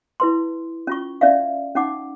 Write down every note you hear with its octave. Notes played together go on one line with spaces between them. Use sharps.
E4 B4 C6
C#4 F4 C#6
C#4 D5 E5 F5
C#4 D#4 F#5 D6